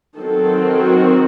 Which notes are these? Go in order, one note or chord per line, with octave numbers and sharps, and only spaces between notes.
D#3 F#3 C4 A4
F#4